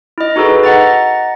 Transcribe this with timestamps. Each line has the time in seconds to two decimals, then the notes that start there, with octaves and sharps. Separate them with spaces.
0.18 E4 D#5
0.36 D#4 F#4 G#4 A4 B4
0.63 D#5 F#5 A#5 A6